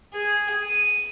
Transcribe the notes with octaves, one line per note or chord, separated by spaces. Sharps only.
G#4
D#7